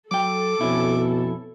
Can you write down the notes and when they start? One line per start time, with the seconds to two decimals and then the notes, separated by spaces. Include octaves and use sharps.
0.11 F#3 A4 G5 D6
0.61 F2 B2 C#4 E4